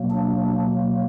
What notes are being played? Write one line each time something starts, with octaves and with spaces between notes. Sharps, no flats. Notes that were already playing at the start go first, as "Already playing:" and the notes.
Already playing: B2 F#3 A#3
D4